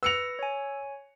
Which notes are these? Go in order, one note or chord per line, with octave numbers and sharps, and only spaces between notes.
B4 E6 A#6 C#7 F7
C#5 G#5